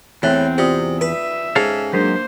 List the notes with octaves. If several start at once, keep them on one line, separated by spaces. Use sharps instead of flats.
E2 A2 C4 E5 F#6
C3 F4 D5 D#6
B4 E5
G#2 C#4 A4 F5
F#3 G#3 A#3 D4 A#4 C5 B6